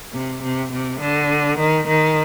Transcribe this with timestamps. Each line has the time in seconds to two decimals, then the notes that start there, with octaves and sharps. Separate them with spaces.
0.14 C3
0.43 C3
0.72 C3
1.00 D3
1.59 D#3
1.88 D#3